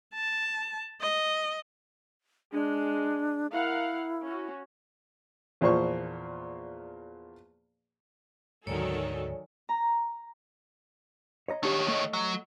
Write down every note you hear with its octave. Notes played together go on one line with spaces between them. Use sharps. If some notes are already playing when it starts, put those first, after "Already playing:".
A5
D#5
G#3 D4
E4 A#4 F5 F#5
C#4 F#4
E2 A#2 F3 C5 C#6
D2 G#2 D#3 F#3 A4 C#5 D5 G#5
A#5
C#5 D#5 A#5
D#3 D4 G4 C#5
A3 D#5
F#3